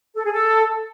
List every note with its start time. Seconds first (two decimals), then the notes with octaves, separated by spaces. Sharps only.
0.16 A4
0.24 G#4
0.33 A4